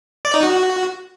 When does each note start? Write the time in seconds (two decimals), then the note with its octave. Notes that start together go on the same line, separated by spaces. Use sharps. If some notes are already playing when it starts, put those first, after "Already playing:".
0.25 D5
0.34 D#4
0.43 F#4